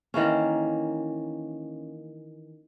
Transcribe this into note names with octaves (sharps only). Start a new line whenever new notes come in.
D#3 E3 A#3 C#4